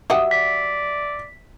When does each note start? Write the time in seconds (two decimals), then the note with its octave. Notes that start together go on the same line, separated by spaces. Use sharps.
0.10 F#3 G4 E5 F#5 D#6
0.31 D5 B6